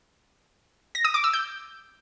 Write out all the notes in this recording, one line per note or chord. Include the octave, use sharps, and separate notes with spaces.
A#6
D#6
D6
E6
G6